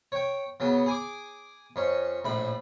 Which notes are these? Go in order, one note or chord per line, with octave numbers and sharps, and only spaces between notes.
C#5 G5
C#3 F#3 B3
G#4 G#5 D6
F2 C#4
A#1 A2 B5